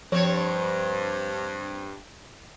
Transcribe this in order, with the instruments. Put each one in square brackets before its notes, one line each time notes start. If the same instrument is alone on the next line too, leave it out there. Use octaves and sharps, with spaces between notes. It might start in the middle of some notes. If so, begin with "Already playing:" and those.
[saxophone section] G2 [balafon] F3 [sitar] C4 C#5